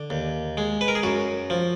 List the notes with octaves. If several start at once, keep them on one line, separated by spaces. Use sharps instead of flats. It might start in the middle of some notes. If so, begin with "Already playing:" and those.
Already playing: D3
D#2
G#3
B4
A#4
G#4
F#2 F#4
F3